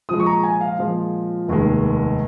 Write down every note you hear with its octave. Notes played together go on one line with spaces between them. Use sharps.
A#2 F3 G#3 D#6
C#6
A#5
G#5
F5
A#2 F3 G#3 F4
F1 D#2 D#3 G#3